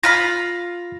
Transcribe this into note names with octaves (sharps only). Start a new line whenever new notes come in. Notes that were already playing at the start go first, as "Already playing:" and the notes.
F4 F5 B5 A#6